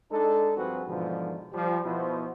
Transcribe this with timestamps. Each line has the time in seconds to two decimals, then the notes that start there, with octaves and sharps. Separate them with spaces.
0.11 G#3 D4 D#4 A4
0.56 G2 F3 C4 F#4 G#4 B4
0.87 G#2 B2 D3 E3 F3
1.52 F3 G3
1.85 B2 F3 B3 E4 F#4 C5